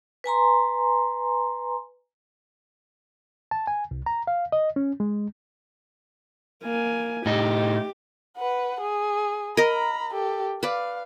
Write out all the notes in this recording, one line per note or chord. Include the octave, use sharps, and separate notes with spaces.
B4 G#5 A#5 C6
A5
G#5
C2
A#5
F5
D#5
C#4
G#3
A#3 G#5
A2 D#4 G4
B4 F#5
G#4
A#4 D#5 A#5 B5
G4 A4
B4 D5 F5